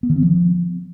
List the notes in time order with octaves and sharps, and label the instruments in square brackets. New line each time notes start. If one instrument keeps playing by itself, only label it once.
[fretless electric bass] B3
D#3
C4
F3